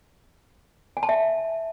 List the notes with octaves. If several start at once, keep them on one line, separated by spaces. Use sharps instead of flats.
G#5
A5
E5